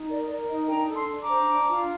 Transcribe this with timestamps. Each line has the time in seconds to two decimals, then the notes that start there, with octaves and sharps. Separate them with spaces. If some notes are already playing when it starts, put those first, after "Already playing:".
Already playing: D#4
0.09 A#4 D5
0.29 A#4 D5
0.48 D#4 D#5
0.68 D4 G5 A#5
0.88 A4
0.95 A5 C6
1.08 D4
1.22 A#5 D6
1.28 C5
1.48 D4
1.69 F4